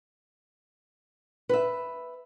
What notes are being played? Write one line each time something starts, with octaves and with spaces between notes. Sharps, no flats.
B4 E5